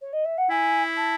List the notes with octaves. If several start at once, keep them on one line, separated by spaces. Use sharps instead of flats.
C#5
D#5
E5
F#5
E4 G#5
A5